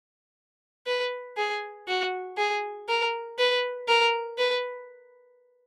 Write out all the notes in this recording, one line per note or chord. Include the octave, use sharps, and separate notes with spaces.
B4
G#4
F#4
G#4
A#4
B4
A#4
B4